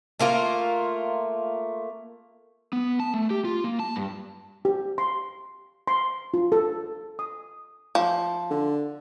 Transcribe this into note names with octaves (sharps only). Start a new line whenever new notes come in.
A3 A#3 F4 A#4
B3
A5
A3
G4
F4
A#3
A5
G2
G4
C6
C6
F4
A4
D#6
F3
D3